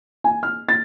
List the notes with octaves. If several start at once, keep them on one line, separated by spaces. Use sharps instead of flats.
G#5
F6
A6